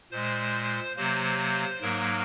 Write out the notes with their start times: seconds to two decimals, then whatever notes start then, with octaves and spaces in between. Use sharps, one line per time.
0.12 A#2 G#3 C5
0.97 C3 F#3 A#3 C5
1.39 C5
1.81 G#2 F#3 A#3 A#4